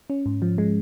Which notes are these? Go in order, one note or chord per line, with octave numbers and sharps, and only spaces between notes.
C#4
G#2
F3
G#3